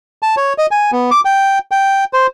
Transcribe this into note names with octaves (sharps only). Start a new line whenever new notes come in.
A5
C#5
D#5
G#5
B3
D6
G5
G5
C5